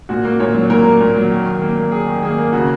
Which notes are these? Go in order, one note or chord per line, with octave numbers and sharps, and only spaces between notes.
A#2 F#4
A#3
A#2 C#5
F#3
A#2 A#4
A#3
A#2
F#3
D#3
D#3
A#3
A#3
D#3 G#4
D#3
A#3 G#4
A#3
C#3 F#4